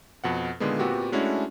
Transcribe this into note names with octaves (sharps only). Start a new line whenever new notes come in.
F2 B2 F#5
A#2 D3 D#3 G#3 A#3 B3
A#2 B3 C4 F#4 G4
G#3 A3 C#4 D4 E4 F#4